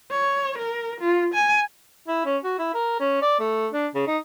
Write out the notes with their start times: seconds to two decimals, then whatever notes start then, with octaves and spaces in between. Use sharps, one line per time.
0.11 C#5
0.59 A#4
1.01 F4
1.34 G#5
2.08 E4
2.25 C#4
2.44 F#4
2.59 E4
2.75 A#4
3.00 C#4
3.22 D5
3.40 A3
3.73 D4
3.95 C#3
4.07 D#4